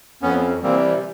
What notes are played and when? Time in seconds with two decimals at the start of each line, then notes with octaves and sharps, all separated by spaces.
0.22 F2 B3 C#4
0.62 C3 E3 G3 A#3 C4